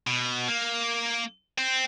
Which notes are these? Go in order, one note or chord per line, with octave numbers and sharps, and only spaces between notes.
B2
A#3
C4